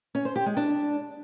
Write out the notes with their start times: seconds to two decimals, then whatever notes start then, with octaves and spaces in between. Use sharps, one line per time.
0.15 C#4
0.25 C5
0.36 G4
0.46 G#3
0.57 D4